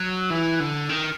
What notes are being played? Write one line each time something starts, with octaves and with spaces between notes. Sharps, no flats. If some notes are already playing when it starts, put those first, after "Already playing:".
Already playing: F#3
E3
D3
D#3